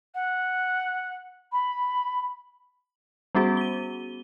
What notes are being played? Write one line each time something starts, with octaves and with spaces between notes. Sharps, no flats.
F#5
B5
G3 B3 C#4 F#4 G#4
D#7 G7